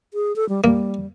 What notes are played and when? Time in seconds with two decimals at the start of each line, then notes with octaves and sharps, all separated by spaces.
0.14 G#4
0.36 A4
0.49 G3
0.64 G3 A#3